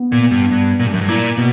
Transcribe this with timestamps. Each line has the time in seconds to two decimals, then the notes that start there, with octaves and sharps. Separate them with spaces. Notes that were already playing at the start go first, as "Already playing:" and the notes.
Already playing: B3
0.12 A#2
0.31 G2
0.51 G2
0.79 A#2
0.86 G2
0.94 F#2
1.01 G2
1.09 A#2 E4
1.37 B2 A#3